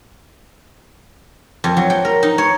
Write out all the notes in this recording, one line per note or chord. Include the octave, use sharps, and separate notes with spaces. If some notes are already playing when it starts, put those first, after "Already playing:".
F2
F#3
G5
A#4
D#4
C#5